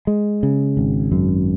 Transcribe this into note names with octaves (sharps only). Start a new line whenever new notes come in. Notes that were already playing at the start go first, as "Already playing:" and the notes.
G#3
C#3
G#1
F#2